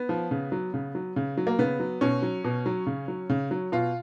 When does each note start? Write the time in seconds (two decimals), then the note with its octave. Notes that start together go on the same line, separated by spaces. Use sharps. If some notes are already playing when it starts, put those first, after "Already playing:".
Already playing: B3
0.09 F3
0.31 C#3
0.52 F#3
0.74 C#3
0.95 F#3
1.16 C#3
1.37 F#3
1.47 A#3
1.59 C#3 B3
1.80 F#3
2.01 B2 C#4
2.22 F#3
2.44 B2
2.66 F#3
2.87 C#3
3.08 F#3
3.30 C#3
3.51 F#3
3.72 B2 F4